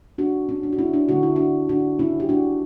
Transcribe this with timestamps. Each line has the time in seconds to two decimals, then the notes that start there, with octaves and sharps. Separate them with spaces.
0.18 D4 F#4
0.49 C#4
0.63 D4
0.73 F#4
0.78 C#4 E4
0.94 D4
1.08 D3 A3 F#4
1.23 E4
1.36 D4 F#4
1.69 D4 F#4
1.99 C#4 E4
2.20 G4
2.29 D4 F#4